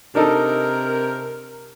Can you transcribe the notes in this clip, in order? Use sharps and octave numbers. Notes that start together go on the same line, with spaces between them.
C3 D4 D#4 A4 A#4